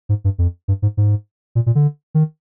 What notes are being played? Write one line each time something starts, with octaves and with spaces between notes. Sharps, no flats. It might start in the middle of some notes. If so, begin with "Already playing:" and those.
G#2
G2
F2
G2
G#2
G#2
A#2
A#2
D3
D#3